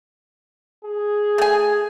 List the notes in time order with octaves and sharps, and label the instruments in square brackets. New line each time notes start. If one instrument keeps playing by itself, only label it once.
[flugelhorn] G#4
[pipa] A3 G#5